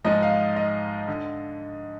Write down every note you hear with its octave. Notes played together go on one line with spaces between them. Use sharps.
G#2 F3 G#3 D#4 D#5
F5
D#5
D3